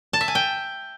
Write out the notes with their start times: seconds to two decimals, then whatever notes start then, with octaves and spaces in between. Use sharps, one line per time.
0.13 A5
0.21 E5
0.28 G#5
0.35 G5